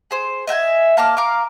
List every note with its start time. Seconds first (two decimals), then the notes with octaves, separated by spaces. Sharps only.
0.11 G#4 C5
0.47 D#5 E5 G5 G#5
0.97 A#3 A5 D6 F6
1.17 A#4 F5 D6